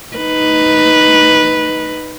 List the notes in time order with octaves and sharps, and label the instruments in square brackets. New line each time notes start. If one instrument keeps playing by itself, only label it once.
[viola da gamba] D#4 B4